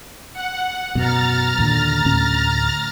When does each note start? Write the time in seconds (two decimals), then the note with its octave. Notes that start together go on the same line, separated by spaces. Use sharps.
0.33 F#5
0.95 F#2 B2 A#5 F6 A6
1.58 D#2 A#2 D3
2.05 D2 A2 C#4